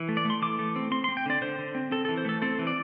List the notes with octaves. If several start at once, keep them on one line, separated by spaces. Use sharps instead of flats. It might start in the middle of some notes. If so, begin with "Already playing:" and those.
Already playing: E3
A3
D5
A3
C6
E3 D6
A3
C4
C4 C6
C6
C4
G5
D3 D5
D3 C5
D3
C4
C4 A4
A4
E3
C5
A3 A4
C4 A4
E3
D5